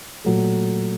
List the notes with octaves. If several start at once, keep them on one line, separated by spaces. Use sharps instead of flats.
A#2 F#3 A3